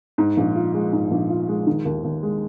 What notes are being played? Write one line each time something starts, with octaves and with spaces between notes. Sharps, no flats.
G#2
A#1
F4
G#3
G#2
A#1
F4
G#3
D#3
D#2
D#2
G#3